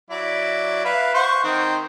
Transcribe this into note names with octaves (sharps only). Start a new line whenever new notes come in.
F#3 E4 D5
B4 E5 F5
C5 F#5 C#6
D#3 C4 C5